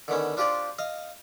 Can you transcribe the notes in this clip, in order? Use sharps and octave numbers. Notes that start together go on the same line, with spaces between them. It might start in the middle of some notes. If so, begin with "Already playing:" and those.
D3 D#3 B3 C#4
D4 F4 G4 C5 D5
D#5 F5